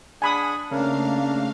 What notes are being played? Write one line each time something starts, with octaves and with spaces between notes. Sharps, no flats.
D4 G#4 F#5 G#5 B5 D#6
C#3 A3 A#3 D4 A#4 F5